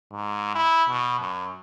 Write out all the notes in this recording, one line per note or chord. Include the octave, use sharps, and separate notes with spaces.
G#2
E4
B2
F#2